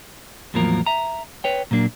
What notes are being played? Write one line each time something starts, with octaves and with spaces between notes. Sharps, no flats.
E2 A2 F3 F#3 A#3 A#4
E5 A#5
B4 C#5 G5
A#2 F#3 A#3 D4